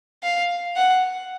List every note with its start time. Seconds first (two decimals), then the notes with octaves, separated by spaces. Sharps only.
0.23 F5
0.76 F#5